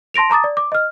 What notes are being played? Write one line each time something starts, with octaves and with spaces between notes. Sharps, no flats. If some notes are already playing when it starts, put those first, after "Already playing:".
A5 C6 A#6 D7 F7
A5 A#5 D6 D#6 A6
D5
D6
D#5 F6